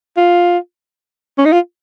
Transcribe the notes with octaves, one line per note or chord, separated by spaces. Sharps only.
F4
C#4
D#4
F4